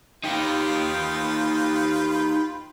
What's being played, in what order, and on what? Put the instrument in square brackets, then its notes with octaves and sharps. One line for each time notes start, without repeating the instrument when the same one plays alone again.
[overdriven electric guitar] D#4 G4 [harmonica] F4 B4 G5